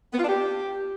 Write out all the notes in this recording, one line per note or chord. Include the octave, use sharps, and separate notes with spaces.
B3
F4
D4
G4